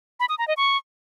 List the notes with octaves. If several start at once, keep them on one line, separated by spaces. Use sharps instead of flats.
B5
D#6
A#5
D#5
C#6